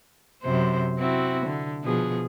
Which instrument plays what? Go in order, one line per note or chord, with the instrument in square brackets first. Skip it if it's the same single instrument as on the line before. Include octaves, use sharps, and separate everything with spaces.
[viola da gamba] F#2 C3 C5
C4 E4 F#4
D3
B2 F3 G#4